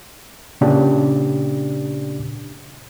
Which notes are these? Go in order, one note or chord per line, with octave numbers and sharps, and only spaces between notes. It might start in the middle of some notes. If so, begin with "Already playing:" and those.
A#2 C#3 D4 G4 D5